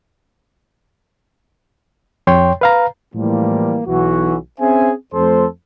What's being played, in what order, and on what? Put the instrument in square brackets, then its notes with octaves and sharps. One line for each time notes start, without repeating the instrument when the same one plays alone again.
[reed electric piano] F2 C#5 G5 C6
B4 F5 A#5
[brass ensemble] A2 E3 F3 G3 A#3
B1 E3 F#4
C4 C#4 G#4 C5 E5 G#5
F2 A3 A4 C5